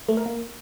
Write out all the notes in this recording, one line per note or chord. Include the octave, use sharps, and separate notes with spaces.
A3
A#4
A#3